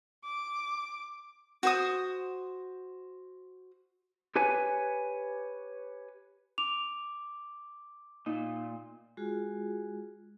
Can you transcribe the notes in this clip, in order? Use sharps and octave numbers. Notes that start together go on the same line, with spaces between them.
D6
F#4 C5 D#6
G4 B4 C#5 G#5
D6 F7
A#2 D#4
G#3 F4 F#4 G#4